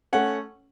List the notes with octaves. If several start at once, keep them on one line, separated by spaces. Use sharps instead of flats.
A3 C#4 F#5